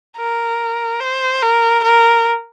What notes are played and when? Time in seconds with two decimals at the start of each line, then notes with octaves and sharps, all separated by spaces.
0.17 A#4
1.00 C5
1.42 A#4
1.84 A#4